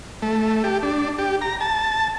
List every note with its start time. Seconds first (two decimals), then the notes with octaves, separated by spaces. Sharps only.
0.22 A3
0.64 G4
0.83 D4
1.19 G4
1.41 A#5
1.61 A5